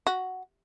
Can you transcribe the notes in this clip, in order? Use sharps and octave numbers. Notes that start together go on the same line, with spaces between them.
F#4